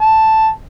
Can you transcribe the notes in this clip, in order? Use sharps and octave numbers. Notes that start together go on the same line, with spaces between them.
A5